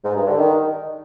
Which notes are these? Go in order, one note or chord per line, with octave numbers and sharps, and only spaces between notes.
G#2
G2
D3
D#3